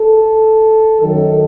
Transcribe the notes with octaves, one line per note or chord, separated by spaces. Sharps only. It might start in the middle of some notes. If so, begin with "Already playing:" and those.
Already playing: A4
F#2 D#3 F#3 A4